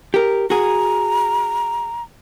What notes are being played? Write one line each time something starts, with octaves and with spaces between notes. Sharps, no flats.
G4 A#4
F#4 G#4 A#5